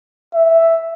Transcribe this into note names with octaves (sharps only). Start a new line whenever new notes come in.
E5